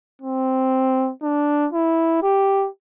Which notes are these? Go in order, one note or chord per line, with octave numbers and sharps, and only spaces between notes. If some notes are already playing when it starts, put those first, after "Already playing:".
C4
D4
E4
G4